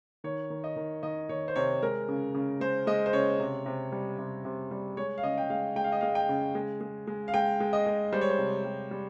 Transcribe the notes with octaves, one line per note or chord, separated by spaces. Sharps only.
D#3 C#5
D#3
D#5
D#3
D#3 D#5
D#3 C#5
C5
C3 C#5
G#3 A#4
C#3
C#3
G#3 C5
G#3 D#5
C5
C#3 C#5
C3
C3
G3
C3
C3
G3
G#3 C#5
F5
C#3 D#5
G5
G#3 F5
G#3 G5
F5
D#5
G#3 F5
G5
C#3
G#3
G#3
G#3
F5
G#3 G5
G#3
D#5
G#3
G3 C5
C#5
C5
C3
G3
G3